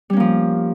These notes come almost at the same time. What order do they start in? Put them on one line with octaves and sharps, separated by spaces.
G3 C#4 A#3 F3